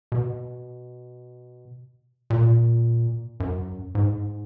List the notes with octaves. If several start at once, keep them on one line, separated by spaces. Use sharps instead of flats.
B2
A#2
F#2
G#2